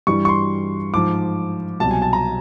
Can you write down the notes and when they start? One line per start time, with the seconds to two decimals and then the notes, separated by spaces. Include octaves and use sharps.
0.07 G2 E3 G3 C#6
0.25 C#6
0.29 C6
0.94 G#2 F3 D6
1.80 C2 B2 F#3 A5
1.91 G#5
2.02 A5
2.13 A#5